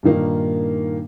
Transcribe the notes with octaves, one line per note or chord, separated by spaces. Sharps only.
G2 A#2 D#3 A#3